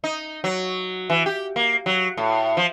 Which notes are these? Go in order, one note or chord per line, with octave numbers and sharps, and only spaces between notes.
D#4
F#3
E3
G4
A#3
F#3
A2
F3